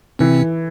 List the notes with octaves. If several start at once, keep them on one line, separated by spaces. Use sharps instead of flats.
C3 E3 C4